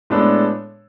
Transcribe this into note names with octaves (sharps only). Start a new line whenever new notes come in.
A2 G#3 B3 D4 A4